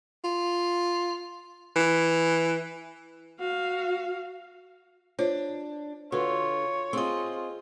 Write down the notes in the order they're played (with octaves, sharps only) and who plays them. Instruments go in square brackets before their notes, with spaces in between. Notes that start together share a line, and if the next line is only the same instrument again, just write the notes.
[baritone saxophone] F4
E3
[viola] F#4 F5
[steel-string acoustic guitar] D4 [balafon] F4 C5 C#5
[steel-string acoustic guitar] D3 [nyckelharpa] F4 [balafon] F#4 B4 [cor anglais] C#5
[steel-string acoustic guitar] C4 D#5 [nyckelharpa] F4 G#4